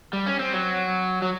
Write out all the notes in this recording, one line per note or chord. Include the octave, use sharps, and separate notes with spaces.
G3
C#4
C4
F#3
F#3